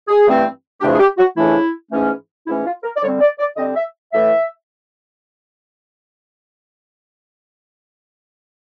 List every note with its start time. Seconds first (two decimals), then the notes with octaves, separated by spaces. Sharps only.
0.08 G#4
0.26 G2 E3 A3 C4
0.81 F2 C#3 E3 A3 D4 G4
0.94 G#4
1.00 G4
1.18 F#4
1.37 F2 C#3 E3 A3 D4 E4
1.92 G#2 E3 A3 C#4
2.47 G#2 E3 A3 C#4 E4
2.65 F4
2.83 A#4
2.97 D5
3.03 D3 G3 C4 C#5
3.21 D5
3.39 D5
3.57 D3 G3 C4 D#5
3.76 E5
4.13 A2 E3 A3 E5